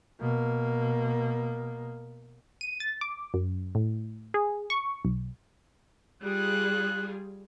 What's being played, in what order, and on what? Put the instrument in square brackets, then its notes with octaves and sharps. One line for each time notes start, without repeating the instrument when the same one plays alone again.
[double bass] B2 A#3
[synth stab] D#7
A6
D6
F#2
A2
G#4
C#6
B1
[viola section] G3 F4 G#4 [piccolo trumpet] F#6